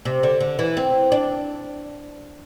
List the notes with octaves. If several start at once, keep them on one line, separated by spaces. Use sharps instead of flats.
C3
D3
D3
E3
C4
D4